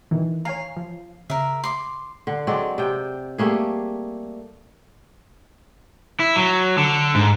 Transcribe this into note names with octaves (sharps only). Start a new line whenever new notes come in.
B2 D#3 E3
C#5 F5 G#5 A#5
F3
C#3 A#4 E5
C6 D6
D3
F#3 G#3 C4 D5
C3 G5
G3 A3 A#3 G#4
E4
F#3
D3
G#2